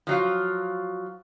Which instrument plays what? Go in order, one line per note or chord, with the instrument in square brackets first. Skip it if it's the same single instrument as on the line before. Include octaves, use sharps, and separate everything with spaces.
[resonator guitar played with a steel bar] F3 F#3 F4